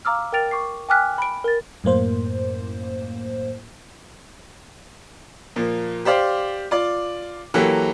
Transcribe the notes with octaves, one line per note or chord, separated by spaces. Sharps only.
F5 A#5 D6 E6 F6
A#4 G5 F6 A6 D7 F7
C#6 D6 C7
G5 G#5 D6 F6 F#6 B6
B5 D7
A#4 A6
F#2 A2 A#3 C5
A#2 F3 A#3
G4 C5 D5 F5
F4 D5
E3 F#3 A#3 F#4 G4 A4